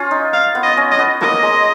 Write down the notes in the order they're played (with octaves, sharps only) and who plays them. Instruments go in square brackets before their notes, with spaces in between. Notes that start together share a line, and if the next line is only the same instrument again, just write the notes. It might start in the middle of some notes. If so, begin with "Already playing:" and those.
Already playing: [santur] C#4 F4
D#4
[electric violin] F5
[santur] B3
[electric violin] D#5
[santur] C#4
[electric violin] D#5
[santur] B3
[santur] A#3 [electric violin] D#5
[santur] G#3